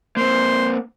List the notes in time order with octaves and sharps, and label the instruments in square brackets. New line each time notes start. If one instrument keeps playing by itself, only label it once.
[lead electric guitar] A#3 C4 [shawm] C5